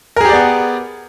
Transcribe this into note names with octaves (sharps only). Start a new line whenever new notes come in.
B3 G4 G#4 A#4 D5